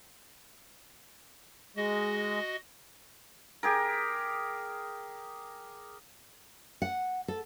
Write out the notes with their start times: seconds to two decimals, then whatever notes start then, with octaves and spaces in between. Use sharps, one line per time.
1.77 G#3 F#4 D#5
3.63 G4 G#4 A#4
6.82 F#5
7.28 A4